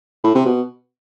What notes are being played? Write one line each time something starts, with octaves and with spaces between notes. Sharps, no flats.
A2
C3
B2